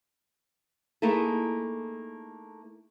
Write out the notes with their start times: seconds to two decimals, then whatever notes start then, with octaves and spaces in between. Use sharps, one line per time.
1.02 A3 A#3 D#4 E4 G#4 A4